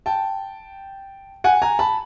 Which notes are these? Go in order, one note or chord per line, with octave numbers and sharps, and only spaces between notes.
G5 A5
F#5 G#5
G#5 A#5
A5 B5